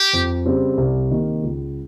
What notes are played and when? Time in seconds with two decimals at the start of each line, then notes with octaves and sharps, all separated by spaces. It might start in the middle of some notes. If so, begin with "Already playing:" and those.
Already playing: G4
0.13 F2
0.45 C#3 G3 C4
0.77 C2
1.10 C3 D#3 A#3 D#4
1.43 C#2